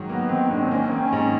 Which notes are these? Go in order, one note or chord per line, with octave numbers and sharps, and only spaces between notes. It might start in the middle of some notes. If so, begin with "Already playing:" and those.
Already playing: G#2 D#3 F#3
A#3 B3
D#3 C4
G#2 D4
C4
A#3 C#4
D#3 C4
C#4
G#2 C#4